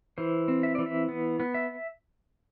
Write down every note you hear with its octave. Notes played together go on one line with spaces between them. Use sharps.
E3 C5
C4
E5
E3 D5
E5
B3
B3
E5